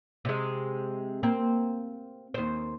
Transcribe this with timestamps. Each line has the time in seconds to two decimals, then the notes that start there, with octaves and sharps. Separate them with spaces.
0.25 C3 G#3
1.23 A#3 C4
2.34 D#2 C5